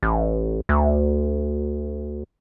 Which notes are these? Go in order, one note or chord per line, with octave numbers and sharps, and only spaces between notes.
A1
D2